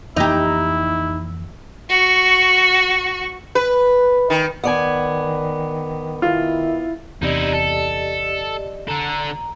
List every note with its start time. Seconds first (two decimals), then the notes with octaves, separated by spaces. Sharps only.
0.17 F2 E3 A#3 D#4 E4 G4
1.89 F#4 C#6
3.55 B4
4.30 D#3
4.64 D#3 B3 D5 G#5
6.22 D#3 E4 F4
7.22 E2 C3 D#4 E4 G4 D5 D#5
7.53 A4
8.88 D3 A4 A#5